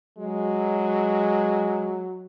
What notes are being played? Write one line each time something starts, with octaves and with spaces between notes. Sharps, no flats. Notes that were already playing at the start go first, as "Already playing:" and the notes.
F#3 G#3